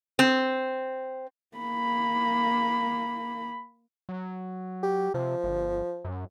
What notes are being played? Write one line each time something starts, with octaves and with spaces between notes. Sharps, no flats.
C4
A#3 B5
F#3
G4
C3 F3
G1
F#2